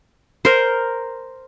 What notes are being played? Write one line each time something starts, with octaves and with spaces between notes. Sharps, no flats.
A#4 C5